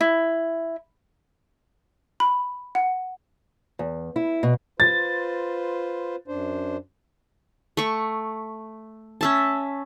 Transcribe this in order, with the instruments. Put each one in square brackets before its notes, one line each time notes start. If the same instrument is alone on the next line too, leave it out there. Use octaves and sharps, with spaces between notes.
[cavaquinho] E4
[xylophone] B5
F#5
[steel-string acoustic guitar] E2
E4
B2
[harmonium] F4 B4 C5 [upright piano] A6
[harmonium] F#2 D4 C5
[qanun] A3 C#6
C#4 E5 A5